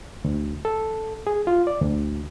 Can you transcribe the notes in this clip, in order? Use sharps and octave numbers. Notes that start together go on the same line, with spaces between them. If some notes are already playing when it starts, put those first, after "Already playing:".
D2
A4
G#4
F4
D5
D2